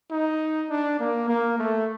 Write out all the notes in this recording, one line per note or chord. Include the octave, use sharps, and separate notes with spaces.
D#4
D4
A#3
A#3
A3